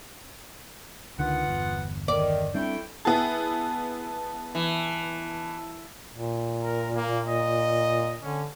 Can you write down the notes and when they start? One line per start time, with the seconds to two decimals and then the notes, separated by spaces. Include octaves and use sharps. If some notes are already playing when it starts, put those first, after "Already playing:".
1.19 C#2 D3 D#3 B3 F4 F#5
1.47 G1 E2
2.08 D#3 D5
2.54 G3 A3 C4 D4 E4 G5
3.05 B3 E4 G#4 A5
4.55 E3
6.14 A#2
6.64 A#4
6.95 A#3
7.26 D#5
8.22 D3 C#4